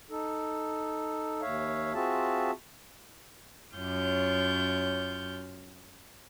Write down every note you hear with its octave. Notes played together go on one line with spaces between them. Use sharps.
D#4 A4
D#2 C#5 E5 F5
C4 F4 F#4 G#4 E5 A5
F#2 F4 C#5 G6